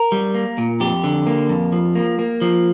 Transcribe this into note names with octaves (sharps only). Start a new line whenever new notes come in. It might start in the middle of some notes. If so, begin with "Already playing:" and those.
Already playing: A#4
G3
A#3
A#2
F2 G4
D3
A#3
F2
F3
A#3
A#3
F3